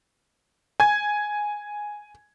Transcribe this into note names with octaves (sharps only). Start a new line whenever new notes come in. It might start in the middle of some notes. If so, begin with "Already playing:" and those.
G#5 G#6